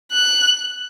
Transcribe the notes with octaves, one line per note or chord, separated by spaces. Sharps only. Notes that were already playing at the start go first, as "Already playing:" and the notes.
F#6